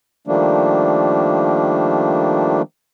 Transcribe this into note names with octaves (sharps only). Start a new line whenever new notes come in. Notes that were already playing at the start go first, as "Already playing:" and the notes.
D#3 F3 G3 A3 A#3 D4